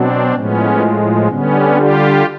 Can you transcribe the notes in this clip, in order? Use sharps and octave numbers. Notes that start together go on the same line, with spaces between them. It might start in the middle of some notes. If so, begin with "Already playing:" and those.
Already playing: B2 F#3 C4 D4
A2 F3 G#3 B3 C#4
D3 G3 B3 C#4
F4 G4